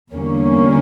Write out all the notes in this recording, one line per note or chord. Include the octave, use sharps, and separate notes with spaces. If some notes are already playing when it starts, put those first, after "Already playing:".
E2 D3 G3 A#3 C#4